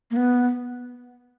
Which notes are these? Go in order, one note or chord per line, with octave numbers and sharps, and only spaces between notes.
A#3
B3